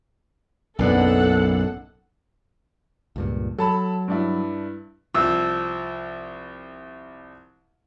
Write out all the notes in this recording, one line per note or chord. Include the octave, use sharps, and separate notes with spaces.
F#1 B1 A2 B3 D4 A4 F#5
C#2 G2 A#2
F#3 A4 A5 B5
G2 D4 E4
C2 F3 E6